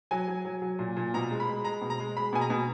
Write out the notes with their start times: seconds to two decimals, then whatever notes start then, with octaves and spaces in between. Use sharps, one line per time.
0.11 F#3 G#5
0.28 F#3
0.45 F#3
0.62 F#3
0.79 A#2
0.97 A#2
1.14 B2 A#5
1.31 G#3
1.40 B5
1.47 G#3
1.64 G#3 A#5
1.82 B2
1.90 A#5
2.00 G#3
2.17 G#3 B5
2.33 B2 G#5
2.41 A#5
2.50 B2